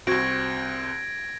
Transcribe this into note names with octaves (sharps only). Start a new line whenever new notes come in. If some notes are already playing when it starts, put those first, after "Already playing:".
C2 C4 F#4 G#6 A#6 D7